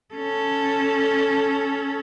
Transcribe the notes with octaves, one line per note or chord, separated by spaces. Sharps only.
C#4 A4